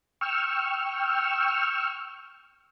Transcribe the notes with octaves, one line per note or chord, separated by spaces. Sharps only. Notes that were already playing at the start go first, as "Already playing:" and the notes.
G5 C#6 E6 F6